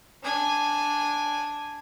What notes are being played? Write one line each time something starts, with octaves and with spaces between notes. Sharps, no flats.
D4 G#5